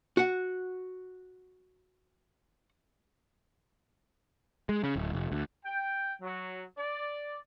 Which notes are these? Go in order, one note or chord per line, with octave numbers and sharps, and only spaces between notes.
F#4 F#5
G#3
C#3
D1
F1
D2
G5
F#3
D5